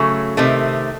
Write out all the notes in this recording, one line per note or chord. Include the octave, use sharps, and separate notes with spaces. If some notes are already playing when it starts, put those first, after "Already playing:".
Already playing: C#3 F#3 A3
C3 D#3 A3